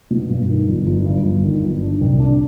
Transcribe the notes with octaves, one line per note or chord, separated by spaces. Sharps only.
B2
G2
D#3
G1
G1
G2
G1
D#3
G1
D4
C2
D4